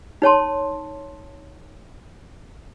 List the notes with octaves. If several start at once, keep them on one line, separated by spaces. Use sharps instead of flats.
D#4 C#5 A5 C6